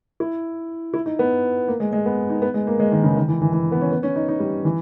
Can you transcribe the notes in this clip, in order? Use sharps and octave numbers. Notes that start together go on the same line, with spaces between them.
E4
E4
D#4
B3
A#3
G#3
G#3
B3
D#4
B3
G#3
A#3
G#3
D#3
C#3
D#3
E3
E3
E3
B3
C#4
B3
C#4
D#4
D#4
G3
E3